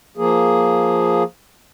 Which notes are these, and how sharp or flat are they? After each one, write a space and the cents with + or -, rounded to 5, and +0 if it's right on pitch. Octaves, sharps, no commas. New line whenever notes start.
F3 +0 A#3 +0 G#4 +0